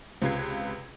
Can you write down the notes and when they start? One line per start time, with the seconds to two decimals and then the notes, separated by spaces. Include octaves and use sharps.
0.22 C#2 C3 F4 B4 G#6 C7